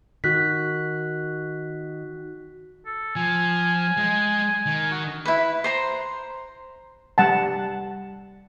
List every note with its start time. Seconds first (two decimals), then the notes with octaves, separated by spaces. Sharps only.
0.24 D#3 F#4 F#6 B6
2.86 A4
3.16 F3 G#5
3.97 G#3
4.66 D#3
4.91 F#4
5.25 E4 B4
5.64 C5 A#5 C6
7.18 G3 F#5 A5